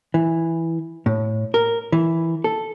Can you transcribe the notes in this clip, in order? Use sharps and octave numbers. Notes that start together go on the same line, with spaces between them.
E3
A2
A#4
E3
A4